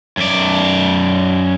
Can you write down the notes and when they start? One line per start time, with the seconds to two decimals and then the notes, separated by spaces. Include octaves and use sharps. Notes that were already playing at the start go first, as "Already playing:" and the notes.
0.17 F#2 D5